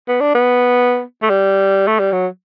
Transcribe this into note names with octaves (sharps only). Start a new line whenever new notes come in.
B3
D4
B3
A3
G3
A3
G3
F#3